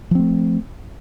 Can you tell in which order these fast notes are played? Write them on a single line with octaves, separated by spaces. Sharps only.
F3 C4 A3